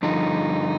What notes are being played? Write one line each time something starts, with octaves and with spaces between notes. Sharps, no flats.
G2 D3 F3 D#4